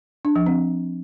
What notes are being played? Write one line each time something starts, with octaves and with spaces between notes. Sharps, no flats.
D4
F3
C4